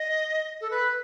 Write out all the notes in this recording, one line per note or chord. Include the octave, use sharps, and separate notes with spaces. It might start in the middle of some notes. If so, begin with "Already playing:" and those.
Already playing: D#5
A4
B4